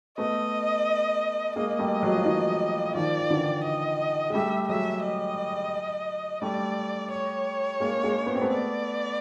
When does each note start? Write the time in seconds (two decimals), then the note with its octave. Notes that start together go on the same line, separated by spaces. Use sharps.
0.18 A3 B3 D#5
1.56 G#3 A#3 D#5
1.79 G3 A3
2.03 F#3 G#3
2.15 F3
2.26 E3 F#3
2.95 D#3 F3 D5
3.19 F3
3.30 D3 E3
3.64 D#5
4.30 G#3
4.34 G3 A3 E5
4.68 F#3 G#3 E5
5.03 D#5
6.42 G3 A3 D5
7.11 C#5
7.80 G#3 A#3
8.04 G#3 A#3
8.26 B3
8.34 C4
8.41 A3 B3
8.50 D5